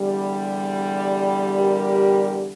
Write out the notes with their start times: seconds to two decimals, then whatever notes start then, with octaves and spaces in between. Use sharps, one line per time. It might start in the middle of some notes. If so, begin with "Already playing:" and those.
Already playing: E2 D3 G3
1.56 G4 A#4